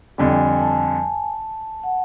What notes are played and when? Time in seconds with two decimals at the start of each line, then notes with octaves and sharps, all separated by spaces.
0.18 F2 D3 G3 G#5
0.32 G#5
0.46 G#5
0.60 A5
1.83 F#5